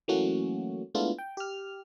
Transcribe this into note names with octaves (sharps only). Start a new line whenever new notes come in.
E3 F#3 A3 A#3 C#4 F#4
G#3 A3 B3 D4 E4 F4
G5
G4 F6